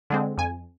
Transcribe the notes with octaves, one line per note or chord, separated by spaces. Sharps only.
D3 G#3 C4
F2 G#5